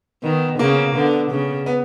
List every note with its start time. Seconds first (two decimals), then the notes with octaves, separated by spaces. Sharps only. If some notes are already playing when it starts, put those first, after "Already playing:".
0.23 D#3 B3
0.59 C#3 A#3
0.95 D3 B3
1.30 C#3
1.66 B3